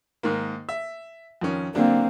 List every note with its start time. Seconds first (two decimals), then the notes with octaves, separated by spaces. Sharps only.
0.23 G#2 D#3 A#3
0.69 E5
1.41 F2 D#3 C#4
1.75 D3 F#3 A#3 C4 D4